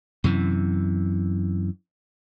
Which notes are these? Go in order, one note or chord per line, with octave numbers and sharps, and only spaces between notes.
F#2 C3 E3